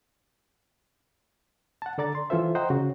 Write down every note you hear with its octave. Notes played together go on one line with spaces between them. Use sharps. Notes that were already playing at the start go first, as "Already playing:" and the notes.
F#5 A5
D3 A4 D5 A#5 A6
C6
E3 E4 F4 A4 C5 E5
C5 D#5 F#5 G5 A#5
C#3 F#4